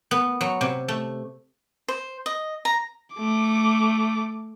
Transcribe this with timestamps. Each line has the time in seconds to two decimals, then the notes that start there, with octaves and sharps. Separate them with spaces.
0.11 B3
0.41 F#3
0.61 C3
0.88 A3
1.88 C5
2.26 D#5
2.65 A#5
3.14 A3 D6